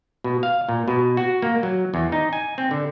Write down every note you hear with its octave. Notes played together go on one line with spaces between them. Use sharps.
B2
F5
A#2
B2
F#4
A#3
F#3
E2
D#4
G#5
C4
D3